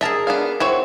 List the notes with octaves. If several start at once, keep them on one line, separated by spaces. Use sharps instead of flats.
G#4 A#4 D#5 E5 A5
B3 D4 F5
C4 E4 F#4 C#5